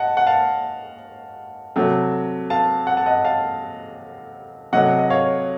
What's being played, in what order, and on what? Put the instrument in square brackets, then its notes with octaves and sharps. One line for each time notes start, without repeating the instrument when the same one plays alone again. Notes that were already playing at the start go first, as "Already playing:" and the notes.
Already playing: [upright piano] D#5 F#5 A5
F#5
F5 A5
C3 F#3 A3
F5 A5
F#5
A5
D#5 F#5
F5 A5
C3 F#3 A3 D#5 F#5
D#5
C#5 F5